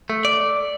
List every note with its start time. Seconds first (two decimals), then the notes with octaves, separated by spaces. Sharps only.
0.09 A3
0.25 D5